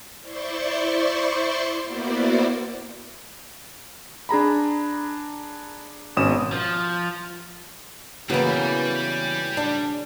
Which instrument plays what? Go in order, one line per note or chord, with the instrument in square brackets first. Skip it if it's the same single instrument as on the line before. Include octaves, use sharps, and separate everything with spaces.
[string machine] E4 C5 D5 C6 C#6
A#3 B3 E4 F#4 C5 D5
[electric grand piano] D4 G#4 A#5 B5
G#1 B2 C#4 D#6 E7
[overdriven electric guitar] F3
[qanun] C#3 F#3 A#3 [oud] E3 B3 [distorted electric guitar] G3
[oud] D4